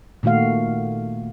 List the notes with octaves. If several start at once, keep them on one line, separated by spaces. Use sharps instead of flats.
A#2 D#3 A3 F#4 F5